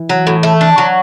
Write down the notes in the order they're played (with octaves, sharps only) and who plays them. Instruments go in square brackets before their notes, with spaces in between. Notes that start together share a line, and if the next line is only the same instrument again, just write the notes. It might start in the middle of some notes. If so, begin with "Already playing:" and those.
Already playing: [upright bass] E3
[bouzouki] F#3
A2
A3
D4
F#3